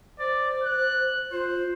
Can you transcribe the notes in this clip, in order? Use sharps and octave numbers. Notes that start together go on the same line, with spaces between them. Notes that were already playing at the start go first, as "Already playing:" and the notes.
C5 D5
F#6
F4 C5